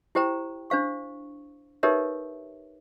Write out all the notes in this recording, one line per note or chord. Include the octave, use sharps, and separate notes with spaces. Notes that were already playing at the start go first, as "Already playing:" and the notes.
E4 G4 C5 G5 A#5
D4 C5 F5 C#6
D#4 G4 A#4 B4 C#5 E5